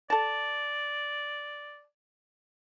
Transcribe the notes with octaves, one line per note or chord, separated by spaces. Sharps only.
A4 D5 A5